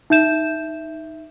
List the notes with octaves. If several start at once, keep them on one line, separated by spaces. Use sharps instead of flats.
D#4 E5 G6 E7